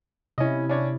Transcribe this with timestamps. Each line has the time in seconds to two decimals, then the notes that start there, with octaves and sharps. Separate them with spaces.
0.38 C3 C#4 E4 D#5
0.69 C#4 D4 C#5